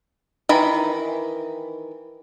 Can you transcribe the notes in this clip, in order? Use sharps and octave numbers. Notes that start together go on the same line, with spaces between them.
D#3 E3 B5